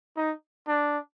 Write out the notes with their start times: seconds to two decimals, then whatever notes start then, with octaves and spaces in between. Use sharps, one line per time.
0.17 D#4
0.68 D4